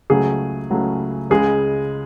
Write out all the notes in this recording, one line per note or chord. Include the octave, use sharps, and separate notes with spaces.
C#2 C#3 F#3 A3 G#4
C#2 C#3 F#3 A3
C#2 C#3 G#3 G#4